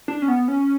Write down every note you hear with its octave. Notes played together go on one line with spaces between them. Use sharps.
D4
C#4
B3
C#4